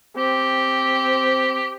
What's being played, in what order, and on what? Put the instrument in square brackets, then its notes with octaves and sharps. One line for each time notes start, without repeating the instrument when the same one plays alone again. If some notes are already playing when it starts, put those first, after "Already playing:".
[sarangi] C4 [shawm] G4